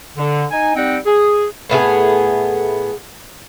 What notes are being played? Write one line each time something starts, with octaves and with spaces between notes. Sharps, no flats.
D3
D#4 G#5
G3 C4 D#4 F#5 G5
G#4
A2 B3 D#4 G#4